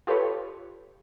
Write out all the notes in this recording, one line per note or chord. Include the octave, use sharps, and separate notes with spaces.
F4 G4 A4 B4 C#5